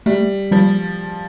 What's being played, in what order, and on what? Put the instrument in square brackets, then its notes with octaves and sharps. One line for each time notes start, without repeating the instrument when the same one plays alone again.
[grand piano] G3 [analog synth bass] A3
[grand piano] F3 [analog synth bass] G3